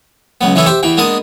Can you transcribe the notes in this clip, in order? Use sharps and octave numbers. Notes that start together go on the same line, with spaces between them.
C#2 F#3 B3
E3 B3 C#4 E4 A4
G4 C5 E5
E2 E3 G5
G#3 A#3 B3 D4 D#5 D#6